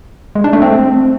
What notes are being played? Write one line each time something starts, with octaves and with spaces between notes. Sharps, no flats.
G#3
D4
A3
C4